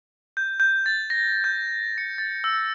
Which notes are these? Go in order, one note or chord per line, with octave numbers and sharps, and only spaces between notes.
G6
G6
A6
A#6
G6
C#7
A6
E6